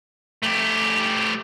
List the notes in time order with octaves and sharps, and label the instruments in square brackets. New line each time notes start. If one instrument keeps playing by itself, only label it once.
[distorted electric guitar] A3 G4